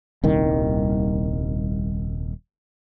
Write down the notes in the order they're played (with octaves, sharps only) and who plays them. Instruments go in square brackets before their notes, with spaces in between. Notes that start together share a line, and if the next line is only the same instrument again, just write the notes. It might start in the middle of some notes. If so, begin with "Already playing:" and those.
[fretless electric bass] D#1 C2 D#3